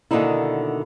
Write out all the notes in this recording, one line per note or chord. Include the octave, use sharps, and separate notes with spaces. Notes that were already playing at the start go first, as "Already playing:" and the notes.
B2 D3 D#3 A#3 D#4 E4